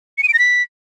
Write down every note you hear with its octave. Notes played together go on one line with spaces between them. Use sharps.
C#7
D#7
D7
A#6
B6